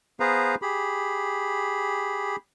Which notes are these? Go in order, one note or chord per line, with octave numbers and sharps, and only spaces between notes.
B3 G#4 B4 C5 F5 A#5
G4 G#4 B5